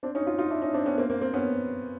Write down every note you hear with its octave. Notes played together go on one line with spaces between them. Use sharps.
C4 D4
C#4 D#4
D#4 F4
D#4 F4
D4 E4
C#4 D#4
C4 D4
B3 C#4
A#3 C4
A#3 C4
A#3 C4
B3 C#4